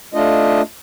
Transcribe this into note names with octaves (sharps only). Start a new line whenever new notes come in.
A3 D4 F4 D#5